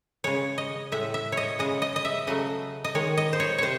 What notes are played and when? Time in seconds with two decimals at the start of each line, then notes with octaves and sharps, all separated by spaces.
0.24 C#3 G#3 C#5
0.58 D#5
0.92 A2 G#3 E5
1.14 E5
1.32 C#5 D#5
1.59 C#3 G#3 D#5
1.82 D#5
1.96 D#5
2.05 E5
2.27 C#3 F#3 A3 D#5
2.84 D#5
2.95 D#3 G#3 C#5
3.17 D#5
3.33 C5
3.40 C#5
3.58 C3 C5 C#5